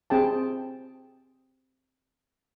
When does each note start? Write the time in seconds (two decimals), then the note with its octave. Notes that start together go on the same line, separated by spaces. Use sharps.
0.10 C4 G#4 G5 A5